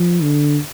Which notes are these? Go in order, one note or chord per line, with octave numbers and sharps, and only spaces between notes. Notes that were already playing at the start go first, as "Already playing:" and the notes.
Already playing: F3
D3